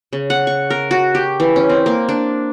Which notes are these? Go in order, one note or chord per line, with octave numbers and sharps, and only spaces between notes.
C#3
F#5
C#6
A#4
F#4
G4
E3
C#4
C4
A#3
D4